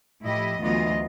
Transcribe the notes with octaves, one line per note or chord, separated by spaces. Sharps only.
A2 F3 E4 G4 D#5
D2 E3 F#3 B3 F4 D#5